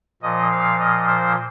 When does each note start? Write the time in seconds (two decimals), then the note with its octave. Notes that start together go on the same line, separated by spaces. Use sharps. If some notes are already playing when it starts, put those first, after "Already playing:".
0.22 A#2 F3 D#5
0.51 F5
0.79 D#5
1.07 C5